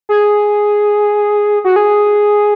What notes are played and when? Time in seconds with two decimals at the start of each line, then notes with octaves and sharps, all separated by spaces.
0.09 G#4
1.64 F#4
1.76 G#4